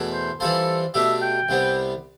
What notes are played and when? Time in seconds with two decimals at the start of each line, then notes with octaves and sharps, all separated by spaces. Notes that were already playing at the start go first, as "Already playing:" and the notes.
Already playing: E2 B2 A3 E4
0.12 C5
0.40 E3 G3 C4 F4 A4 C5
0.94 B2 A3 D4 G4 E5
1.22 G5
1.49 C2 C3 G3 B3